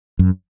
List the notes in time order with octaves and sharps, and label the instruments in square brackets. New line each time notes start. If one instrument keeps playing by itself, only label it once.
[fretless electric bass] F#2